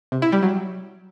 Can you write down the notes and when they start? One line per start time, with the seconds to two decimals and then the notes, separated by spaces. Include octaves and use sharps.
0.12 C3
0.22 E4
0.32 G3
0.43 F#3